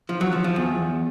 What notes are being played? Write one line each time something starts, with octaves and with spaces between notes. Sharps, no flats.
F3
F#3
F3
F3
E2